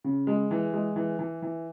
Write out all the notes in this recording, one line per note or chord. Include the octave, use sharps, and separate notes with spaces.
C#3
G#3
E3
G#3
E3
E3
E3